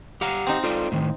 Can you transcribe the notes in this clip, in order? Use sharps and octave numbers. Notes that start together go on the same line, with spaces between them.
G4 F5 F#5 A#5
C4 D#4
F4 A4 D5
A2 D#3